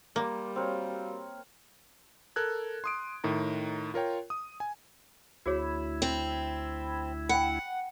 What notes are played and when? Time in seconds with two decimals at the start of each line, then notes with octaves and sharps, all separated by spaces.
0.16 G3 A#3 C6 D6
0.56 C4 F#4 A#4 C#5 F5
2.36 A4 A#4 F#6 G#6
2.84 C6 D#6 D7
3.24 A2 D#3 A#5
3.94 F4 A#4 C#5 G5
4.30 D#6
4.60 G#5
5.46 D2 E4 F#4 G#4 C#5
6.02 C4
7.29 F#5 G5 B5